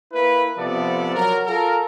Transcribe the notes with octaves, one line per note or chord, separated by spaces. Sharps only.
A#3 E4 B4
C3 F3 B3 A4 D5
F#3 A#4
F4 A4 A#4